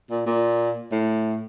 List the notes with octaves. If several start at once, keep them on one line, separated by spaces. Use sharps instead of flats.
A#2
A#2
A2